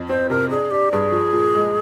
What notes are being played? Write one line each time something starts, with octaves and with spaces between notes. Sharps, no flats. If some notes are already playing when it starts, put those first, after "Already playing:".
Already playing: F2
C4 C5
C3 A#4
D4 G#4
D4 G4
G2 G#4
F3
A#2
G#3